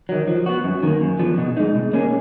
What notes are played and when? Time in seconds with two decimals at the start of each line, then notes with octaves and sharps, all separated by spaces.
0.09 D#3 F#3
0.28 F3
0.46 B3 F#4
0.64 F#2
0.83 D#3 A#3
1.01 F#2
1.19 F3 B3
1.38 B2
1.57 G#3 D#4
1.75 B2
1.93 A#3 C#4 G#4